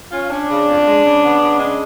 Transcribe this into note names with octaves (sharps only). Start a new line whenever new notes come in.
C#4 F4
C#4 D4
C#3
F2
G#3
C#3
B3
C#3
G#3 D4